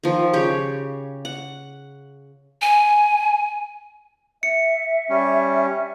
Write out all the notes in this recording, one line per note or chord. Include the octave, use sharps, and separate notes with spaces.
D#3 F3
C#3 G4 C#5
F#5
G#5
E5 C#7
G3 C#4